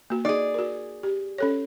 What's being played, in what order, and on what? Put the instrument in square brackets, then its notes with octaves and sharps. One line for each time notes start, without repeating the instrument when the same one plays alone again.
[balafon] A#3 F#4
[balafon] D#4 D#5 [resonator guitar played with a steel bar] G#4 D5
[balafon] F#4 A#4
G4
C#4 A4 C#5